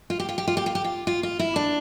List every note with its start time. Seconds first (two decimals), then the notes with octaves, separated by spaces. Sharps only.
0.10 F4
0.20 G4
0.29 F4
0.38 G4
0.48 F4
0.57 G4
0.66 F4
0.75 G4
0.84 F4
1.07 F4
1.23 F4
1.39 E4
1.56 D4